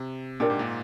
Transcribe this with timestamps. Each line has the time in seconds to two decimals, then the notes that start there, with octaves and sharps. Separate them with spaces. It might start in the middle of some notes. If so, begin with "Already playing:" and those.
Already playing: C3
0.40 A#2 D4 G4 A#4 D5
0.50 G#2
0.59 A#2